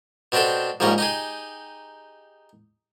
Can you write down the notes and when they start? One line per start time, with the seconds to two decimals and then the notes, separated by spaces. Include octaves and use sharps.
0.32 B2 C4 D4 G4 A4
0.80 A#1 G#2 G3 C#4 A#4
0.98 D#4 G4 G#4